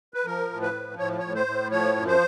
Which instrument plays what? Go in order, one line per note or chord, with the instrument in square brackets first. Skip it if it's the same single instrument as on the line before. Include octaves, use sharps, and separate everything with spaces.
[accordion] B4
F3 A#4
A2
B4
F3
A2 C#5
A2 C#5
C5
A2
F3 C#5
F#2
C5